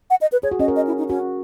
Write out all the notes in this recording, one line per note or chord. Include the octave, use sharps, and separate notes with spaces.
F#5
D#5
B4
G#4 C#5
F#4
C#4 D#5
A#4
D#5
E4
D#4
C#4 F#4